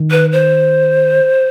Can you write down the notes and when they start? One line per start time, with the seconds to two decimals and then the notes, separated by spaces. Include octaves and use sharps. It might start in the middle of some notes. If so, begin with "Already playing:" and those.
Already playing: D#3
0.11 B4
0.32 C5